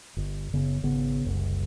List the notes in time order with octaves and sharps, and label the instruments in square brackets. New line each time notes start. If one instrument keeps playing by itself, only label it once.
[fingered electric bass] G1
F#1 C#3 B3
G#1 C#3 B3
F#1 C2